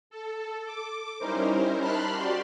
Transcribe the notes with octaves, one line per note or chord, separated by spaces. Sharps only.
A4
D6
G3 C#4 D#4 E4 A#4 C5
A5 B5 C6 F6 F#6
F#4 G4 D5 C6